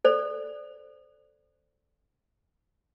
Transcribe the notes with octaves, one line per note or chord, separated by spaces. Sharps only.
A4 C5 D5